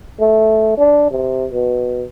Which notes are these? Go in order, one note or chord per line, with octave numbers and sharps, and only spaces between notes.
A3
D4
C3
B2